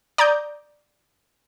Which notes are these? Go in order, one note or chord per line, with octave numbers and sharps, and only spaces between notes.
D5 A#5 D#6 G6